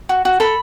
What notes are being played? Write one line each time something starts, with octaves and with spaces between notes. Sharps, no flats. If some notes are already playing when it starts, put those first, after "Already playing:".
F#4
F#4
A4 B5